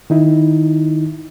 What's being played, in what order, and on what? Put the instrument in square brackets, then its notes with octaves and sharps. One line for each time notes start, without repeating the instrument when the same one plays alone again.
[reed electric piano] D#3 D#4 E4